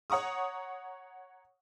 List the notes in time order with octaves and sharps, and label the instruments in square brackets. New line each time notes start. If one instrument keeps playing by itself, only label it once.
[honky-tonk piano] C#5 F#5 A#5 C#6 D#6